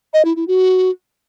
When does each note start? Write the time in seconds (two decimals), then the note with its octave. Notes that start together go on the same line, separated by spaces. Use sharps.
0.14 D#5
0.25 E4
0.36 E4
0.48 F#4